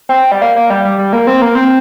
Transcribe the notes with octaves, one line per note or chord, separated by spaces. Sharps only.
C4
G3
A#3
A#3
G3
G3
G3
A#3
C4
A#3
C4